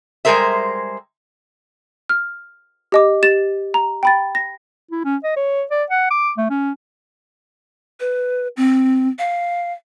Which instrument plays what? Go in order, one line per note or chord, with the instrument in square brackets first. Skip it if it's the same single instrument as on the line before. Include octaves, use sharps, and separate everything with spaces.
[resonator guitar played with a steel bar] G3 G#3 G#4 A#4 C5 E5
[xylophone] F6
G4 D#5 D6
G4 A6 E7
A#5
G5 B5 A6
A#6
[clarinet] E4
C#4
D#5
C#5
D5
F#5
D6
A3
C#4
[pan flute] B4
C4
F5